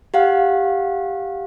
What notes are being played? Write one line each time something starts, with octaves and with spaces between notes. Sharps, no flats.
G4 F5 F#5